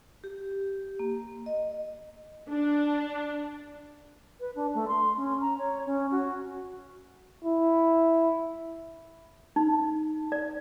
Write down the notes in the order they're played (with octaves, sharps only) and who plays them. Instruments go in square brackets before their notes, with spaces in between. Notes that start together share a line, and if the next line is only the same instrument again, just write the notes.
[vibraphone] G4
A#3
D#5
[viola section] D4
[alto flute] B4
D4
A3
C6
C#4
A#5
C#5
C#4
F#4
[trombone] E4
[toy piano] D#4
D5